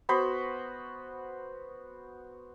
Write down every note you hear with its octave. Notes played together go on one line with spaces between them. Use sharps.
B3 F#4 C5 B5